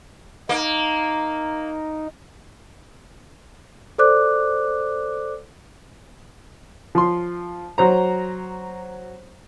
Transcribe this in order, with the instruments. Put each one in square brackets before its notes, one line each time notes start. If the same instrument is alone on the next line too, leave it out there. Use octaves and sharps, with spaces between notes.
[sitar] A#3 [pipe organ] D#4
[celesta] A4 C5 D5 D6 F#6
[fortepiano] F3 C6
F#3 C5 A#5